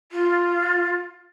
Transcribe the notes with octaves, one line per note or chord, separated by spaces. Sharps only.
F4